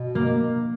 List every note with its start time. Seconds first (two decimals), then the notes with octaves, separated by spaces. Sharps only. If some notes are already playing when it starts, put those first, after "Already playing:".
Already playing: B2
0.15 A#3